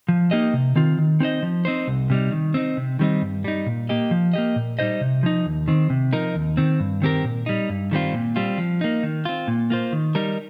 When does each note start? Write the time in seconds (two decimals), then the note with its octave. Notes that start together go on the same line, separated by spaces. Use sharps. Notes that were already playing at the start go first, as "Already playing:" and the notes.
0.09 F3
0.31 A#3 D#4 G4 D#5
0.53 C3
0.76 D#3 C4 F4
0.98 D#3
1.20 C4 D#4 C5 D#5
1.43 F3
1.65 C4 D#4 C5
1.88 C2
2.10 C3 G3 D#4
2.32 D#3
2.54 C4 D#4
2.77 C3
2.99 D#3 G3 C4 D#4
3.22 G2
3.44 G3 D#4
3.66 A#2
3.89 A#3 G4 D#5
4.11 F3
4.33 A#3 G4 D#5
4.56 A#2
4.79 G3 D#4 C5 D#5
5.01 C3
5.23 F3 D#4
5.45 D#2
5.68 D#3 C4
5.90 C3
6.13 F3 D#4 A#4
6.35 D#2
6.57 D#3 C4
6.80 G2
7.02 D#3 C4 G4 A#4
7.24 A#2
7.46 G3 D#4
7.69 G2
7.91 D#3 G3 C4 F4
8.14 A#2
8.36 G3 C4 F4
8.58 F3
8.81 A#3 D#4
9.03 D#3
9.25 C4 F4
9.48 A#2
9.70 A#3 F4 C5
9.93 D#3
10.15 G3 D#4 A#4